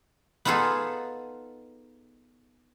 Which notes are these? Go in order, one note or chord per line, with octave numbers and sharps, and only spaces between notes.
B3 D#4 F4 G#4 A4